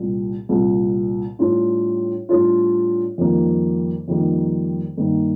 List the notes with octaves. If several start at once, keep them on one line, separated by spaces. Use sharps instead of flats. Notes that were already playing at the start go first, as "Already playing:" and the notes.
Already playing: C2 A#2 G3
C2 A#2 G3
A2 G3 D4 F4
A2 G3 D4 F4
F2 D#3 G3 A#3
F2 D#3 G3 A#3
G2 D#3 A#3 D#4